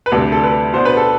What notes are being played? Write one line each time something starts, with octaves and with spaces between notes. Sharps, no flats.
B4
D2 C3 G3 D4 A4
A4
B4
B2 B3 D4 C5
B4
A4